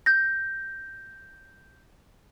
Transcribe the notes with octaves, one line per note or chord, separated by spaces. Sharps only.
G6 A#6